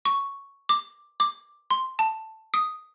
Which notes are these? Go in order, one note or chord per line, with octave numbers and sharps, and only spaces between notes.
C#6
D6
D6
C6
A5
D#6